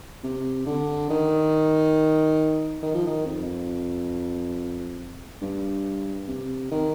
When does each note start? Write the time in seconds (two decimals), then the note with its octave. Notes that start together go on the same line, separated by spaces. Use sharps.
0.24 C3
0.66 D3
1.10 D#3
2.82 D#3
2.95 F3
3.07 D#3
3.26 F2
5.42 G2
6.28 C3
6.71 D#3